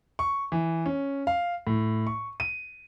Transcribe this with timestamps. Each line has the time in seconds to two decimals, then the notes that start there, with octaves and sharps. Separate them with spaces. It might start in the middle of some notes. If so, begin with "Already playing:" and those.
0.19 C#6
0.52 E3
0.86 C#4
1.27 F5
1.67 A2
2.07 C#6
2.40 D#7